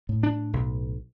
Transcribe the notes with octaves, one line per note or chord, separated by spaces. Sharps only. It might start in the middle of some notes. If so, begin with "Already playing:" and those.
A2
D4
B1